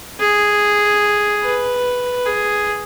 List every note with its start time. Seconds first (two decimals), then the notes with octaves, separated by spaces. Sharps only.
0.20 G#4
1.44 B4
2.26 G#4